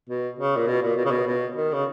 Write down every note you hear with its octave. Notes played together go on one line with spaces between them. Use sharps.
B2
C#3
A#2
B2
A#2
B2
C#3
B2
B2
D#3
C#3